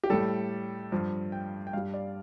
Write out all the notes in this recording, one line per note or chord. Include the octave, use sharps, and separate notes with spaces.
G4
A2 G3 A4
G2 F3
G5
G5
G2 G3 F5
D5